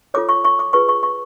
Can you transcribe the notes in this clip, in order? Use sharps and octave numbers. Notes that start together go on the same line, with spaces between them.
F4 A4 C#5 D6
C#6
C#6
D6
F4 G#4 B4 C#6
C#6
C#6